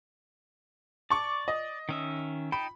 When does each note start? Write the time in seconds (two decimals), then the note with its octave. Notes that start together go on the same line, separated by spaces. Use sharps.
1.10 D5 A5 C#6 D6
1.48 D#5
1.89 D#3 C#4 E5
2.52 D#4 G5 A5 B5